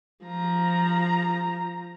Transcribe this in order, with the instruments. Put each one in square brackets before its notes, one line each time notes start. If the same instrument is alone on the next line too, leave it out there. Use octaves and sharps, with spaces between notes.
[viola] F3 A#5